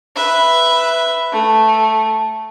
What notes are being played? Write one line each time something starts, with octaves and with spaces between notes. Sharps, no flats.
B4 E5
A3